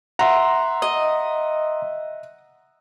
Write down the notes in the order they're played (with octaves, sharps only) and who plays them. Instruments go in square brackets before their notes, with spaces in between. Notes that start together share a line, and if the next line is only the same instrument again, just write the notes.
[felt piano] E5 F#5 [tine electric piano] A#5 C6
[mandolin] D#5